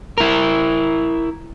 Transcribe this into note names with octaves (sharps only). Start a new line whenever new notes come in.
E4 A#4